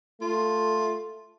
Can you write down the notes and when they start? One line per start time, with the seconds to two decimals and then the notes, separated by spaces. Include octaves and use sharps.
0.21 A3 F4